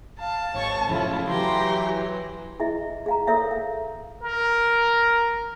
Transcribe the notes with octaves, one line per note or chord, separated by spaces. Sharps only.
F5 A5
G#1 C#5 C#6
F#2 A2 C#3 F3 E4 F4
E3 F#3 G4 A#5 C6
E4 G#4 D#5 E5
G#4 F5 A#5
A4 A#4 C#5 E5 F5
F5
A#4